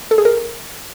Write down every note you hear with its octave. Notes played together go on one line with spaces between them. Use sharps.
A4
G#4
A#4